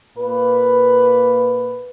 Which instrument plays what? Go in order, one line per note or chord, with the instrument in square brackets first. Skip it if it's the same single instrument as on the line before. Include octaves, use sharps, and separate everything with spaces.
[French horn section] A#2 A#3 B4